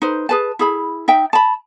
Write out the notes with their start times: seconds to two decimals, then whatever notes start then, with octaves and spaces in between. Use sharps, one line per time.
0.02 D#4 B4 C5
0.29 G#4 B4 A5
0.59 E4 G#4 B5
1.08 D#4 E5 G5
1.33 A5 B5